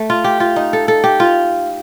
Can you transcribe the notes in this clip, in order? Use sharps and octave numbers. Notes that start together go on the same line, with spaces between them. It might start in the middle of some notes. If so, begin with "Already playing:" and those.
Already playing: A3
F4
G4
F4
D#4
A4
A4
G4
F4